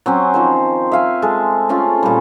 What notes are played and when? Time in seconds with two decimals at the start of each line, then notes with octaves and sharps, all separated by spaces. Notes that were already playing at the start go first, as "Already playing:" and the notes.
0.06 F#3 C4 C#4
0.34 D#3 F3 C5
0.92 E5 F5 G#5
1.22 G#3 A4
1.69 A3 C4 C#4 F4
2.03 A#2 G3